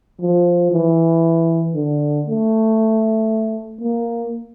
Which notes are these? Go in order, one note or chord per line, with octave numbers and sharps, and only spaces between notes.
F3
E3
D3
A3
A#3